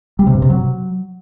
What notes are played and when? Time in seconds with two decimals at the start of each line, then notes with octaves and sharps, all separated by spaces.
0.19 G3
0.27 C3
0.34 G2
0.42 C3
0.50 F#3